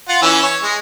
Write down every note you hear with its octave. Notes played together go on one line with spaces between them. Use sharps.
F4 F#5
E3 C#4 E6
C#5
G#3